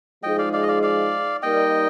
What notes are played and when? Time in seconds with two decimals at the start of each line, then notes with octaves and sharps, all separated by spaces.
0.23 F3 G#3 D#4 G#4 D#5 G5
0.38 D5 F5
0.53 D5 F5
0.63 D#5
0.68 D5 F5
0.83 D5 F5
1.43 G3 A#3 D#4 A#4 D5 D#5 G5